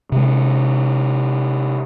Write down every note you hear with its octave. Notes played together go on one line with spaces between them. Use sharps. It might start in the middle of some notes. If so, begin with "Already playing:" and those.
C3 G#3